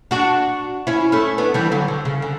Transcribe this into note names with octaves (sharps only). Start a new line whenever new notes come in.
D4 F#4
C#4 E4
A3 C#4
B3 D4
E3 G3
D3 F#3
D3
C#3
D3